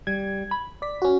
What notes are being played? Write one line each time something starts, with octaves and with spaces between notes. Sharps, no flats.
G3 G#6
B5
D5 B6
C#4 F#4